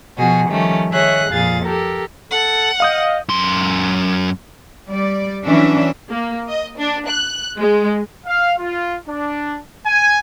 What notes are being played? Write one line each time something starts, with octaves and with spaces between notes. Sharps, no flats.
B2 F3 F#4 G#4
D#3 F3 G3 A3 C#4
D#3 G#4 C#5 E5 F#6 A#6
F2 A#2 G#4 F5 A6
G4 A4 A#4
A4 F#5
D#5 F5 D#6 G6
F#2 C6
G3 D5
E3 F#3 C#4 D4 E5
A#3
D#5
D4
F#6
G#3
F5
F4
D4
G#5